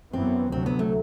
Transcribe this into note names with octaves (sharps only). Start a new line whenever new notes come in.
F#2 E3 B3 C4
D2 C3 F#3 C4
B3
A3